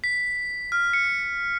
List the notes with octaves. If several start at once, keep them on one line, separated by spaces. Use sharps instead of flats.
B6
F6
C#7